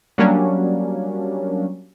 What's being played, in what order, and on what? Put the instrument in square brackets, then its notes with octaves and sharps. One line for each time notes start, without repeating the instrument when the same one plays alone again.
[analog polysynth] F#3 G3 A#3 C#4 D4